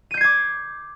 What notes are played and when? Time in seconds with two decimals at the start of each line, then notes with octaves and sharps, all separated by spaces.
0.11 D#7
0.14 G6
0.17 C7
0.21 G#6
0.24 D6